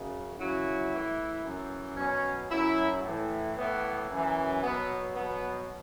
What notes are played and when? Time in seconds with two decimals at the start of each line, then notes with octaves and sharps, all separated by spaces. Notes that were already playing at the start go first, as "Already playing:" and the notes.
Already playing: F#2 C#3 F#3
0.38 F#2 C#3 F#3 E4
0.92 A2 E3
1.44 F#2 E3
1.97 B2 F#3 C#4
2.50 F#2 F#3 E4
3.04 A2 E3
3.56 A2 E3 B3
4.10 F#2 E3
4.63 B2 F#3 B3
5.15 B2 F#3 B3